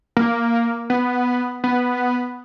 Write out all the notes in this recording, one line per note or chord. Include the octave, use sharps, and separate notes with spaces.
A#3
B3
B3